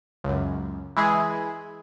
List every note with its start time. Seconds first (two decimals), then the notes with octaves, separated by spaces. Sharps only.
0.24 C#2 F#2
0.97 E3 G#3 E4 G#4